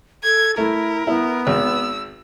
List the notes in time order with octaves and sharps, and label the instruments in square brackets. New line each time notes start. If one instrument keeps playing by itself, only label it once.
[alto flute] A4 [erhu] G#6
[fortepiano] A3 [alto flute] E4 [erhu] A#4
[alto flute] B3 [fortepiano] E4
[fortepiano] G#1 [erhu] E6